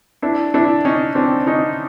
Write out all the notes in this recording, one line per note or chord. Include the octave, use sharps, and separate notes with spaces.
D4 E4
D4 E4
C#4 D#4
C4 D4
C#4 D#4